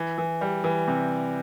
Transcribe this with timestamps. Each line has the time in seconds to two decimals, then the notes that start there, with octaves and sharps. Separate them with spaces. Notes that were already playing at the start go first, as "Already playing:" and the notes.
Already playing: E3
0.18 E3
0.41 G3
0.64 E3
0.87 C3